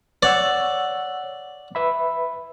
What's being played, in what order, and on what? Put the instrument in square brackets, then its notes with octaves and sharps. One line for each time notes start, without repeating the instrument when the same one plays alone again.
[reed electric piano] C#5 F#5 E6 [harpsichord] D5
[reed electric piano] B4 E5 B5